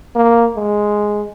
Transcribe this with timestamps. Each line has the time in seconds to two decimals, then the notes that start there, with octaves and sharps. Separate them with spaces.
0.16 A#3
0.56 G#3